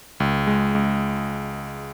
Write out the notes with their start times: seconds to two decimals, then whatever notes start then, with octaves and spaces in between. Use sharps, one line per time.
0.20 C#2
0.47 G#3
0.75 C#2